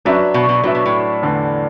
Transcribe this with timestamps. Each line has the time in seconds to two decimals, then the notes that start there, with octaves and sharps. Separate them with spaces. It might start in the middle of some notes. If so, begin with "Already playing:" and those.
0.05 F#2 F#3 D4 B4 E5
0.34 B2
0.49 B2
0.63 A2 F#3 D4 B4 E5
0.75 B2
0.86 A2
1.22 E2 D3 A3 D4 B4